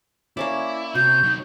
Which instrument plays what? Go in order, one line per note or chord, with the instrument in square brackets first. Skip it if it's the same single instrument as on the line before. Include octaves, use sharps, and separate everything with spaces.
[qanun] A#3 C#4 D5 [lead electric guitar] E4
[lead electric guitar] C3 [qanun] F#4 [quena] G6
[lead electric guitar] F#3 D#4